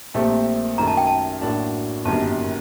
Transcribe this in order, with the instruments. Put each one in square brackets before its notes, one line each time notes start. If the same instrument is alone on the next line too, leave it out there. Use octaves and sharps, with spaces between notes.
[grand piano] A#1 A#2 A3 C4 G4
[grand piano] F#2 D#3 A3 [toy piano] A#5
[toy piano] A5
G5
A5
[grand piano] A2 F#3 A#3 D4 F#4
[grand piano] G1 F#2 D#3 G3 A#3 [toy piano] A5